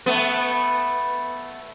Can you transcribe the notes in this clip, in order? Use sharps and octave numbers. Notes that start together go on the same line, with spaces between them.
A3 B3